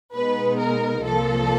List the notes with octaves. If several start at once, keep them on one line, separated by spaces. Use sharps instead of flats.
B2 G#3 B3 D#4 B4
A#4
C2 A#2 F3 A#3 A4